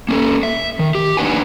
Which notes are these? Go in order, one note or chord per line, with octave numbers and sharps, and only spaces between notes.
A#3 C#4 A4
E5
D#3
G4
A#3 D4 D#4 B4 F#5 G#5